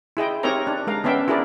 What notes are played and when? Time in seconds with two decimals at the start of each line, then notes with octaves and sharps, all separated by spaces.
0.17 E4 G#4 D#5 G5
0.43 C4 D#4 G4 A#4 C#5 A#5
0.67 D4
0.87 G#3 A#4 F5
1.04 B3 C#4 D4 E5 G5
1.28 E4 F#4 G#4 A#4 D5